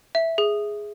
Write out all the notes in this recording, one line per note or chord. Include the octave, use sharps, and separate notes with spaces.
E5
G#4